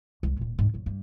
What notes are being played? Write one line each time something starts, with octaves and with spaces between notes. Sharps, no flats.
C#2 G#3
D1 A#2
D2 G#2
A#1 F#2
G2